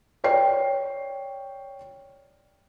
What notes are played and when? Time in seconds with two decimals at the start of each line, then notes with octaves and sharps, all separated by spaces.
0.24 C#5 D5 G5 C7